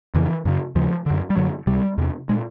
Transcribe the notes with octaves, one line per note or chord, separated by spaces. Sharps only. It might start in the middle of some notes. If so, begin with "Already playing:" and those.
F2 C#3 E3
F#2 C#3
D#2 C#3 F3
F#2 D3
G3
F#2 D3 F#3
C#2 C3 G3
E2 C3
A#2 G#3